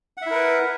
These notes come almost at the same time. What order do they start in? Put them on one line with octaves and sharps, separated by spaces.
F#5 E5 E4 A#4 B4